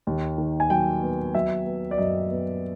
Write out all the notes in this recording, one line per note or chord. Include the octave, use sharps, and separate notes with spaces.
D#2
D#3
G#5
F#3 G5
B3
F#3 E5
B3
D5
F#2 D#5
B3